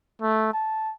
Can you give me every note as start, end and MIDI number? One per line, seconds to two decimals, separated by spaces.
0.22 0.54 57
0.54 0.92 81